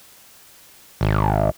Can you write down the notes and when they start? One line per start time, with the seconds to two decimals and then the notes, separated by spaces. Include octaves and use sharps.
1.01 G#1